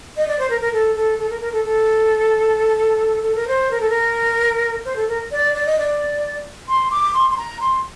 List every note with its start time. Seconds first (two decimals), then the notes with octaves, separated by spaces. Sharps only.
0.17 D#5
0.28 D5
0.39 C5
0.50 A#4
0.61 A#4
0.73 A4
0.96 A4
1.19 A4
1.30 A#4
1.41 A#4
1.53 A4
1.64 A4
3.23 A4
3.36 A#4
3.47 C5
3.71 A#4
3.81 A4
3.90 A#4
4.85 C5
4.96 A4
5.08 A#4
5.32 D5
5.54 D5
5.66 D#5
5.78 D5
6.68 C6
6.91 D6
7.14 C6
7.30 C6
7.37 A#5
7.61 C6